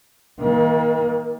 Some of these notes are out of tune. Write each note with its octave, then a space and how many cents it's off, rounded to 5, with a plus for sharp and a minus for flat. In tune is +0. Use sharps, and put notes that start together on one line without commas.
D#3 +45 A#3 +20